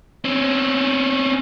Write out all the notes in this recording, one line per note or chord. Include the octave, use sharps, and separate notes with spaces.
C4 C#4